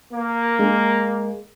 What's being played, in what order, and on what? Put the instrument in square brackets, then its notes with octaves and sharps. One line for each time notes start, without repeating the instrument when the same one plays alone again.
[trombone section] A#3
[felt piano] G#3